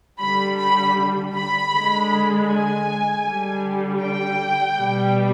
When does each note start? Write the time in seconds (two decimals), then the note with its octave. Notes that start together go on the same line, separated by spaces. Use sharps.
0.20 D3 G3 B5
0.59 B5
1.35 B5
1.73 D3 G#3
2.49 G#5
3.25 D3 G3
4.01 G5
4.77 B2 G3